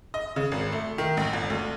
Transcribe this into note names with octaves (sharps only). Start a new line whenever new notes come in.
D#5
C#3
G#1
A3
D#3
A1
G1
D2